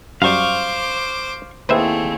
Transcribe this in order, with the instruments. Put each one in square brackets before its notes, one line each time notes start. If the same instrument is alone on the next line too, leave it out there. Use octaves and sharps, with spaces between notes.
[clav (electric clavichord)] F#2 G3 [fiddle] C5 D6 [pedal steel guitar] F5 C#6
[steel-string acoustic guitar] D#2 E4 G#4 [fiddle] A3 C4 [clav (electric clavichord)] B4 C5 E5